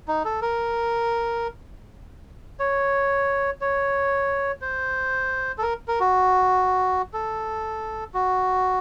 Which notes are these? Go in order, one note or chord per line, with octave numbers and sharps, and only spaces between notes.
D#4
A4
A#4
C#5
C#5
C5
A4
A#4
A#4
F#4
A4
F#4